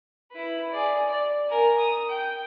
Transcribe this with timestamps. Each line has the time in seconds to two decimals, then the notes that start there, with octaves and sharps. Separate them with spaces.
0.32 E4 B4
0.72 G#4 D5
1.08 D5
1.48 A#4 G#5
1.78 D#6
2.09 G5